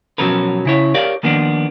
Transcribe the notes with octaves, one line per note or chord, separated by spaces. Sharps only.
B2 F3 F#3 C#4 A#4 B4
C#3 E4 C#5
G4 A#4 C#5 D5 F5
D#3 F3 A#3 B3 D4